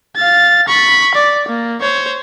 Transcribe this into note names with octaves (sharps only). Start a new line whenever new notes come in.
F5 A6
B5 C#6
D5
A#3
C5 C#5